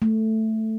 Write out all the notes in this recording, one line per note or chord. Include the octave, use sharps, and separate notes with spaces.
A3